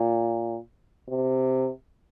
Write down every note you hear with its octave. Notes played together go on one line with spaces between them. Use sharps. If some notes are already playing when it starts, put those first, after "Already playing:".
Already playing: A#2
C3